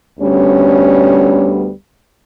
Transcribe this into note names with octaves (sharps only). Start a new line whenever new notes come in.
D2 D3 G3 B3 C#4 C#5